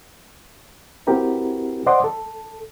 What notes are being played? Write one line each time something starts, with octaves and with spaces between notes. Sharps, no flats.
C4 E4 F#4 G4 A#4 B4
C5 D5 D#5 F#5 C6 D6
A4